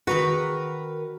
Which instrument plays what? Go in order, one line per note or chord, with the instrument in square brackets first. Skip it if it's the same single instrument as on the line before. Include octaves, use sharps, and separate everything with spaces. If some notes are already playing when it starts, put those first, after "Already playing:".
[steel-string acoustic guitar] D#3 A#4 B4 [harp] F#4